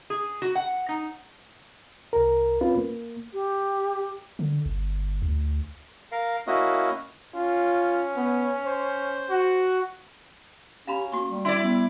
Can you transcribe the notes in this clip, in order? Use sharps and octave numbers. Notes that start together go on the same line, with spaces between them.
G#4
F#4
F#5
D#4
C2 A#4
C4 C#4 F4 B4
A#3
G4
D3
G1
D2
A#4 F5
A#3 C#4 E4 F#4 D#5
C#4 F4
B3
C5
F#4
C#4 G4 F5 A#5 B5
A#3 F#4 C#6
G3
C#4 E4 D5 C6
G3 B3